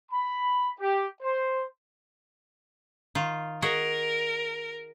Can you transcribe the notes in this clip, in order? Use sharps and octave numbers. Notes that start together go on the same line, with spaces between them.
B5
G4
C5
D#3 F4
F#4 G#4 A#4 D#5